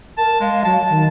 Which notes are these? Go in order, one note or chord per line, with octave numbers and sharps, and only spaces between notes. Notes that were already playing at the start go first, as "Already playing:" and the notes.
A#4 A5
G#3 F5
F#3 A5
D#3